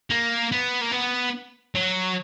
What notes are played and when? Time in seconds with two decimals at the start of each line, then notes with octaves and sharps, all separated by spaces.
0.10 A#3
0.52 B3
0.82 A#3
0.92 B3
1.75 F#3